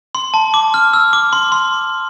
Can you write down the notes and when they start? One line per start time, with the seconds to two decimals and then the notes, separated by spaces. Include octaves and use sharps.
0.15 C6
0.34 A5
0.54 D6
0.74 F6
0.93 E6
1.13 D6
1.33 C6
1.52 C6